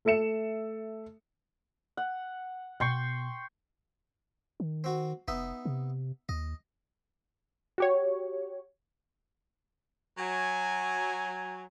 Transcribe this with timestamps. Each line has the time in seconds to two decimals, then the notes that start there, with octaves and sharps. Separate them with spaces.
0.05 A3 A4 E5 C#7 E7
1.97 F#5
2.80 B2 B3 G5 C6 C#6
4.60 D#3
4.84 C4 F#4
5.28 F1 B3 D#4 E5
5.65 C3
6.29 D#2 D#5
7.78 F#4 G4 C#5
10.18 F#3 G#5